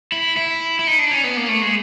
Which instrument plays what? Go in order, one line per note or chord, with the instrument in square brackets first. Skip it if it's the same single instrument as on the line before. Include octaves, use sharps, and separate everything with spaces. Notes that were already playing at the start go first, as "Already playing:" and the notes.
[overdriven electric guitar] E4
E4
E4
D#4
D4
C#4
B3
A#3
A3
G#3